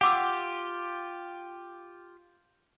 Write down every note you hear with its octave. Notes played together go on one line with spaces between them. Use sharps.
F4 G4 F#5 D6 E6